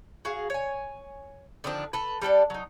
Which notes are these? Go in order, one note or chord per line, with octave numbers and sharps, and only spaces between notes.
F#4 G#4 F5
C#5 G#5
D3 D#3 F3 D4
A4 B4
G3 D4 A4 D5
F#3 D#4